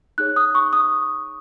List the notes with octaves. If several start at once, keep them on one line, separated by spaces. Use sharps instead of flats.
D#4 G#4 C#5 F#6
D#6
C#6
D#6